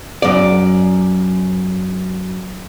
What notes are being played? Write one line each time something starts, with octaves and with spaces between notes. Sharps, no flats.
F#2 D5